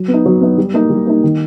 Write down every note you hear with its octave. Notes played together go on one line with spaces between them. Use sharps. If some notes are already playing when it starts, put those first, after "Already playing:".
Already playing: F#3
B3
D#4
F#3
B3 D#4
G3
A#3 D#4
G3
A#3 D#4
D#3